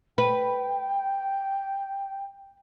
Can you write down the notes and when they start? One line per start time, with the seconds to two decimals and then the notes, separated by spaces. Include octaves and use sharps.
0.18 B4 G5